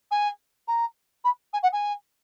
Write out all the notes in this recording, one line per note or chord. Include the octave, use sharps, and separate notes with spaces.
G#5
A#5
B5
G#5
F#5
G#5